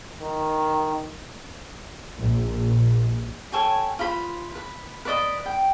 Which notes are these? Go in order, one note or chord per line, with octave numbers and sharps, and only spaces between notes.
D#3
A#1
A4 C#5 G5 G#5
F4 B4 C5 B5
B4
B4 C5 D5 D#5
G5